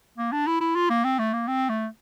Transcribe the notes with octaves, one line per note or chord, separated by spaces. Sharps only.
A#3
D4
E4
E4
F4
A#3
C4
A3
A#3
C4
A3